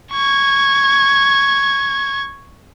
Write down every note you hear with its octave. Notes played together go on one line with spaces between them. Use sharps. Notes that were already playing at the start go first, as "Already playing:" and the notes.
C#6 G#6